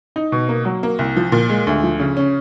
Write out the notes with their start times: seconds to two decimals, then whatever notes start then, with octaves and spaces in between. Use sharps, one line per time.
0.16 D#4
0.32 B2
0.49 A#3
0.65 F#3
0.83 A#3
0.99 C2
1.16 F3
1.32 A#2
1.49 G#3
1.67 D2
1.83 F3
2.00 C#3
2.17 C#4